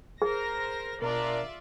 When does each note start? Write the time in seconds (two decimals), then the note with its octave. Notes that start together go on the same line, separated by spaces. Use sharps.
0.22 G#4 A#4 C5 A#6
1.02 B2 D4 F4 A#4 D5 E5 A#5